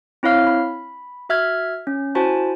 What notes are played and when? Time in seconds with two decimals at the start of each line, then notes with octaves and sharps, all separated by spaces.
0.23 C4 E4 C#5 F5 F6
0.47 B5
1.29 F#4 E5 F6 G#6
1.87 C#4
2.15 E4 F#4 C5 G#5 A5